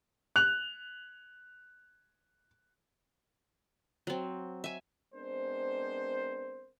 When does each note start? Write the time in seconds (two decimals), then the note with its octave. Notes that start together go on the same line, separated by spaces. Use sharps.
0.36 F#6 F7
4.07 F#3 C4
4.64 E5 G#5
5.14 G#3 B3 C4 D4 A#4 C5